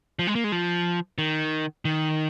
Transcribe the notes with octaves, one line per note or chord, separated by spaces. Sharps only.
F3
G#3
A#3
G#3
F3
D#3
D#3